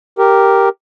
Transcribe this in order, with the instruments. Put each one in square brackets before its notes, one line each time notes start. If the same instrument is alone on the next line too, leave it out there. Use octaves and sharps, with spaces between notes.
[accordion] G4 A#4